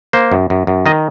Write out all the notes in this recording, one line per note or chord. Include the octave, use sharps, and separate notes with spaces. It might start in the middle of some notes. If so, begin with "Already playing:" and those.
A#3 C5
F#2
F#2
F#2
D#3 D#5